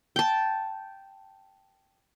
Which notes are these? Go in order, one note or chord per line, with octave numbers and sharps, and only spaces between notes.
G5 A5